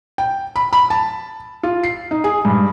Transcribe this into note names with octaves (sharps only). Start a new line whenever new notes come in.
G5
B5
B5
A5
F4
C7
D#4
G#4
G2